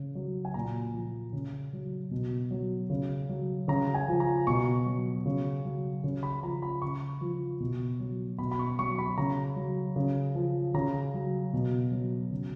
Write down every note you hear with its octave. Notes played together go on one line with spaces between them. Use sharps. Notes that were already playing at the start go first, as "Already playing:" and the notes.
Already playing: C#3
F#3
G#5
A#2 A#5
F3
C#3
F#3
B2
F#3
C#3
F#3
C#3 A#5
G#5
F3
A#5
B2 C#6
F#3
C#3
F#3
C#3
B5
F3 A#5
B5
C#3 C#6
F3
B2
F#3
B2 B5
B5
C#6
F#3 C#6
B5
C#3 A#5
F#3
C#3
F3
C#3 A#5
F#3
B2
F#3
C#3